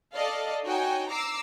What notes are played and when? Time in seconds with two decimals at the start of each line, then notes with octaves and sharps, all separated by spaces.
0.14 A4 D5 D#5 F5
0.65 D#4 F#4 C#5 G5 G#5
1.09 A#5 D6 E6 C7